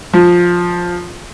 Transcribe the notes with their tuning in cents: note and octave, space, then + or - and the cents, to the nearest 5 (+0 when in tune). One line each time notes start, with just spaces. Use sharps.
F3 +10